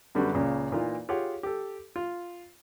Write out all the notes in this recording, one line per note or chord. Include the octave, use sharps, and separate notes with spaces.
F#2 D3 G3 B3 D4 F#4
C#2 A#2 C#3
A#2 E3 A#3 D#4 F4
F4 G4 G#4 C#5 F#5
G4 A4
F4